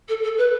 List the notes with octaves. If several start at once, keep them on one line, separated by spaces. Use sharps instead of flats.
A4
A4
B4